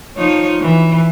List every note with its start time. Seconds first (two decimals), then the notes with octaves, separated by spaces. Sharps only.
0.17 F3 D#4 C#5
0.61 E3